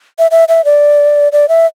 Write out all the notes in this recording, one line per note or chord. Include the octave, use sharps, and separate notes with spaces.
E5
E5
E5
D5
D5
E5